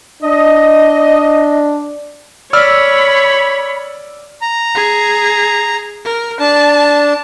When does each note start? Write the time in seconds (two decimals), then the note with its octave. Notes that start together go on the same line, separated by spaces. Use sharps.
0.22 D4 D#5
2.53 C#5 D5 B5 E6 F6
4.41 A#5
4.75 G#4
6.05 A#4
6.40 D4 A5